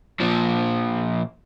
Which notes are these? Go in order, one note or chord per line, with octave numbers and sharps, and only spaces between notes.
A#2 F3